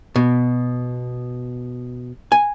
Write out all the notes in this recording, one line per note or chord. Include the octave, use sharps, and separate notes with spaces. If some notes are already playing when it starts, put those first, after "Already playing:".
B2
G#5